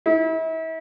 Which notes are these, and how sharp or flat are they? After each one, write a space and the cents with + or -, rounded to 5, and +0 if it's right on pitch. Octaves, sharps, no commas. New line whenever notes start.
E4 -40